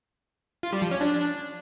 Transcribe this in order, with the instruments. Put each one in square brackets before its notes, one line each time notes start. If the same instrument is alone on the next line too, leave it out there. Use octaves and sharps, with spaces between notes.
[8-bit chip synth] F4
G3
F3
C#4
D4